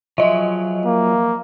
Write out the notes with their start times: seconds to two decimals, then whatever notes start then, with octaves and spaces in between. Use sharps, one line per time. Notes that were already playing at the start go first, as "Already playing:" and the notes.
0.18 F3 F#3 G#4 D#5 E5
0.86 A#3